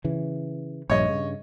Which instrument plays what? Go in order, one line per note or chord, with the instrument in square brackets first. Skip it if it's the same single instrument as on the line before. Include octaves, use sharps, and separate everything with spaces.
[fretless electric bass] C#3 E3
[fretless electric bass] A#1 G2 [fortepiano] C#5 D#5
[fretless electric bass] G2 C#3